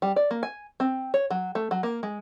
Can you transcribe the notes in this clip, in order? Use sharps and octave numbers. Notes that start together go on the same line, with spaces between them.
G3
D5
A#3
G#5
C4
C#5
F#3
A3
F#3
A#3
G#3